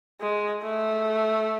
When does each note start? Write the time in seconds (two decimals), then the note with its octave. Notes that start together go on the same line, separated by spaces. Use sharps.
0.21 G#3
0.63 A3